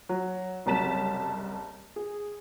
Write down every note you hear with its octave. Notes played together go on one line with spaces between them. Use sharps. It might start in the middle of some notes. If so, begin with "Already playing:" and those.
F#3
F#1 C2 F#3 A5 B6 E7
G#4